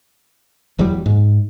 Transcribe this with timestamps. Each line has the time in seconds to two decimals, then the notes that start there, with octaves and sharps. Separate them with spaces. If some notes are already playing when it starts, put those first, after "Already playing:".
0.78 D#1 E2 F#3 G3
1.06 G#2